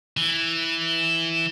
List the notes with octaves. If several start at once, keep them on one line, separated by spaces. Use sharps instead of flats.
E3